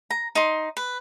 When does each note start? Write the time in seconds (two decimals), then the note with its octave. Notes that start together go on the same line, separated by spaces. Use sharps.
0.10 A#5
0.35 D#4 C6
0.77 B4